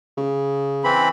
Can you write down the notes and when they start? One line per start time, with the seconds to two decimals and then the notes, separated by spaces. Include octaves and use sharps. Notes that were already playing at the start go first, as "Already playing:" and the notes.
0.17 C#3
0.84 E3 C4 B5